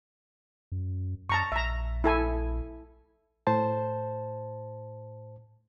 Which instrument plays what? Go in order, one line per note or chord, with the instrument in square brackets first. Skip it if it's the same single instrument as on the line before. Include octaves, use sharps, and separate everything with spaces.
[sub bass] F#2
[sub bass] F#2 [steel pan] A5 A#5 C#6
[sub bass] A#1 [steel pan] E5 A#5
[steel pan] E4 A4 G#5
[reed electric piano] A2 C5 A5